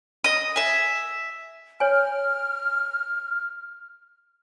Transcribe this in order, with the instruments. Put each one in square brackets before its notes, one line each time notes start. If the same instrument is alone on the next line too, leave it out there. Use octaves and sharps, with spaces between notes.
[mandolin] D#5 D#6
E5 G#5
[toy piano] C#5 G#5 [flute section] F6